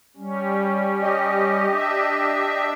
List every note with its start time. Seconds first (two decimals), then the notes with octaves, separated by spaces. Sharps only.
0.17 G3 C#4
1.02 G4 D#5
1.70 D4 E5